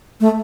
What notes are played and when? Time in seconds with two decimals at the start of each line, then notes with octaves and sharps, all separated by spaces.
0.21 A3